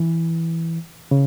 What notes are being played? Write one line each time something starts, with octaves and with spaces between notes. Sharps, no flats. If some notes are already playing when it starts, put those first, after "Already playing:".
Already playing: E3
C#3